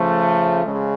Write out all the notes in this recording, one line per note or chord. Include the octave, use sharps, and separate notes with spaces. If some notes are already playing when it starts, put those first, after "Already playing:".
Already playing: C#3 F3 A3
C#3 G#3